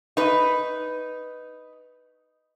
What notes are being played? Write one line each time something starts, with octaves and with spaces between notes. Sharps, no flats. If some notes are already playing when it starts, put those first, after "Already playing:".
D#4 B4